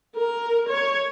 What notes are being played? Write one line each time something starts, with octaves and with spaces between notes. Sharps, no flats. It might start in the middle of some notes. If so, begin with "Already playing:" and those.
A#4
C#5